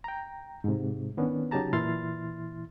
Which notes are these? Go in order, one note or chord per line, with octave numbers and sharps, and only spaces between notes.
G5 A#5
G#2 C3
D#3 B3 C#4 D4
C#3 F#3 D#4 G4 A5 A#5
A#2 E3 E4 C6 F6 A6